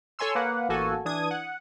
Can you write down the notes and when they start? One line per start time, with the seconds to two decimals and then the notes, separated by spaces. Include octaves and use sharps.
0.19 A4 C#5 G#5 C6 E6
0.35 A#3 B4 F#5
0.69 A1 A#3 F#4 A4 G#5
1.05 E3 D4 D#6 G#6 D#7
1.31 F#5